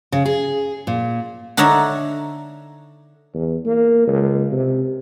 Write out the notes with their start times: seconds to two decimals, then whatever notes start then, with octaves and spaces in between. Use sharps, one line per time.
0.12 C#3
0.25 G#4
0.87 A#2
1.57 D3 D4 D#4 C#5 E5 A#5
3.34 E2
3.65 A#3
4.07 C#2
4.51 C3